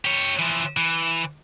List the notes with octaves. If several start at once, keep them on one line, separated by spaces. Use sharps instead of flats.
G4 C#5
E3 F3
E3